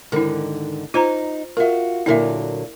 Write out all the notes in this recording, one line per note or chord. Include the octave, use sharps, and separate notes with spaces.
G#2 D3 D#3 E4 A#4
D#4 F4 C5 A#5
F4 F#4 A#4 E5
A#2 D3 F#3 E4 A#4 E5